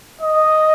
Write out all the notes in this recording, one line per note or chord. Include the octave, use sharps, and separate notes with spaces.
D#5